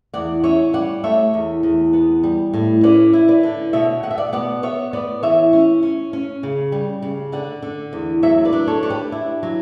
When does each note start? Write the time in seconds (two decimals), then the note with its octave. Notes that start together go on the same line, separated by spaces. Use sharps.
0.14 E2 D5 F#5
0.43 C#4 C#5 E5
0.73 G3 D5 F#5
1.04 A3 C#5 E5
1.34 E2
1.63 E2
1.93 B3
2.23 G3
2.54 A2
2.83 C#4 B4 D5
3.13 E4
3.28 B4 D5
3.43 D3
3.73 B2 C#5 E5
4.03 B2 F#5
4.11 E5
4.18 D5 F#5
4.33 B3 D5 F#5
4.63 B3 C#5 E5
4.93 B3 B4 D5
5.23 E3 C#5 E5
5.53 C#4
5.83 C#4
6.13 C#4
6.43 C#3
6.72 G3
7.02 C#3
7.32 D3 D5 F#5
7.62 D3
7.93 E2
8.23 F#3 C#5 E5
8.45 B4 D5
8.53 D4
8.67 A4 C#5
8.83 D4 C#5
8.90 G4 B4
9.12 E4
9.43 F#3